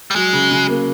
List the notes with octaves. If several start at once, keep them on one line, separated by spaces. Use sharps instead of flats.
G3
F#3 G#3
C#3
C#3
A#3